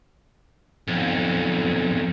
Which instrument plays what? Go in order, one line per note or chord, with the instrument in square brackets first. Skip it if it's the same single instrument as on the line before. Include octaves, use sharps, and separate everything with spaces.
[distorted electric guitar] B1 F2